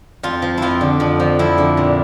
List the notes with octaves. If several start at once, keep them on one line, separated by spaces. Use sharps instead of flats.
F2 F4
F3
F2 E4 F4
D3
F2
F3
F2 E4
D3
A#2